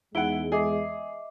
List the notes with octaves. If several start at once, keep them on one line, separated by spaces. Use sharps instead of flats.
E2 G#3 D#4 E4 F#5 D7 G7
G#4 D#5 E5 D6